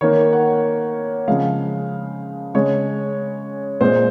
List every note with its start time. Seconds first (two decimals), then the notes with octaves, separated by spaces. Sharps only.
0.01 D#3 A#3 C#5
0.33 F#5
1.28 C#3 F3 G#3 F5
2.54 C#3 G#3 C#5
3.81 A#2 G#3 C5